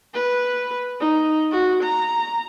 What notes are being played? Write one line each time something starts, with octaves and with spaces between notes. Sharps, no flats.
B4
D#4
F#4
A#5